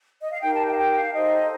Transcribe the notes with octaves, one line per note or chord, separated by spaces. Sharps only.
D#5
F5
D#4 G4 A#4 G5
A5
G5
F5
G5
F5
D#4 A4 C5 D#5